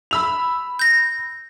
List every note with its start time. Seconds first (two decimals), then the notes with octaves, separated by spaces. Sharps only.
0.11 B5 E6 F7
0.79 G6 A#6